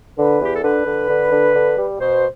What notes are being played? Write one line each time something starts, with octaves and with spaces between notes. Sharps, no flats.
D3 B4
E2 G4
A4
D3 B4
D3
D3
D3
D3
G3
B2 C5